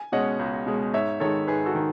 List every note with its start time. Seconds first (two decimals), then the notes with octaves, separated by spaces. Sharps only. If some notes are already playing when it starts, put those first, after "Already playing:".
Already playing: G#5
0.12 B2 G#3 C#4 D#5 F#5
0.39 C#2
0.66 B2 G#3 C#4
0.93 G#2 C#5 E5
1.20 D#3 G#3 A4 C#5
1.47 G#2 G#4 B4
1.66 F#4 A4
1.75 D#3